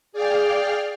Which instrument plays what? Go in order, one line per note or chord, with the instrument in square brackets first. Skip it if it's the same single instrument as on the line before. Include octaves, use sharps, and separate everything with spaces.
[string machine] G#4 D5 F5 G5 F6